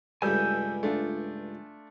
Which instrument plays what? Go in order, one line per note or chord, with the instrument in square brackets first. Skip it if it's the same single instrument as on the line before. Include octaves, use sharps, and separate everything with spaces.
[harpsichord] C#2 G2 [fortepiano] G3 A3 [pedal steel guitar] G#5 E6 G6
[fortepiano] A3 D4 F4